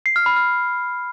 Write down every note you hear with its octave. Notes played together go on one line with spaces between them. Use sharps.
C7
F6
B5
F6